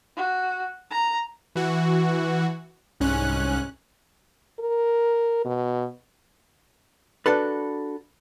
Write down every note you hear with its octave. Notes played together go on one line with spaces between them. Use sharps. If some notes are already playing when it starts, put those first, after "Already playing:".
F#4
A#5
E3 F#4
C2 G#2 C#4 F#6
A#4
B2
D4 F#4 A4 B4